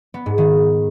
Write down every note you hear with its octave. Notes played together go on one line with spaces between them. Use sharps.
B3
G#2
D#3